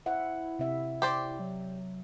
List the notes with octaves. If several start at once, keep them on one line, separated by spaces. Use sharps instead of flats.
E4 C5 E5 F#5
C3 C4 E5
G4 C5 D5
F#3